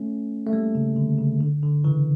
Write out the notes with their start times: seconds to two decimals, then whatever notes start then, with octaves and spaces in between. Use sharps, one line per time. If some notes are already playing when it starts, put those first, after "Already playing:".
Already playing: A3 C#4
0.46 A3
0.53 G3 A#3
0.75 C#3
0.96 D3
1.18 C#3
1.41 D3
1.63 D3
1.84 C#3 E3